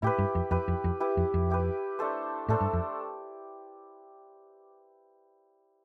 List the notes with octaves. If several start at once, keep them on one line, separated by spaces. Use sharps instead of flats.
A2 E4 G4 B4
G2
F2
F2 E4 G4 B4
F2
F2
E4 G4 B4
F2
F2
E4 G4 B4
A3 D4 A4 C5
A2 A3 D4 A4 C5
G2
F2